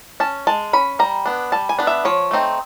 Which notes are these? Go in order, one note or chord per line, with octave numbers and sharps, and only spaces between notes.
C#4 A5
G#3 A5
C#4 B5
G3 A#5
B3 D4
G3 A5
G#5
B3 D4
E5
F3 C#5
A3 C4 D#4